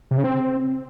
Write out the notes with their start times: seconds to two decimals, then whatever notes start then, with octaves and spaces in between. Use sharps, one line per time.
0.11 C3
0.17 C#3
0.24 C4